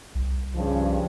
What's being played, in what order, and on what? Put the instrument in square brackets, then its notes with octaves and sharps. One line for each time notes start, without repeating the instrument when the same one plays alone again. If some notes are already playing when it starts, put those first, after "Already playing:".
[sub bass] C2
[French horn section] G2 C#3 F3